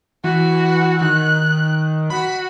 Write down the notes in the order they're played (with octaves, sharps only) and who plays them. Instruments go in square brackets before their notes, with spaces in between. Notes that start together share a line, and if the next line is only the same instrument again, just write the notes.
[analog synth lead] E3 [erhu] F#4
[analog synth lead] D#3 [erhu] F#6
[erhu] F#4 [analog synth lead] B5